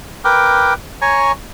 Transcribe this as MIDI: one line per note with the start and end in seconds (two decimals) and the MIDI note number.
0.25 0.74 70
0.25 0.74 71
0.25 0.74 79
0.25 0.74 86
1.02 1.32 73
1.02 1.32 80
1.02 1.32 82
1.02 1.32 85